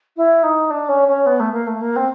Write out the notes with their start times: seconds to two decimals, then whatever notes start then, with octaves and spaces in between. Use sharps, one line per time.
0.16 E4
0.43 D#4
0.70 D4
0.89 C#4
1.08 C#4
1.26 B3
1.40 A3
1.52 A#3
1.67 A3
1.81 A#3
1.96 C4